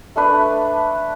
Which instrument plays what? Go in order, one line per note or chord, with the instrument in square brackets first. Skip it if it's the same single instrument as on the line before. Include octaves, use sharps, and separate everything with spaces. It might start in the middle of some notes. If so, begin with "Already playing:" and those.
[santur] A3 D4 B4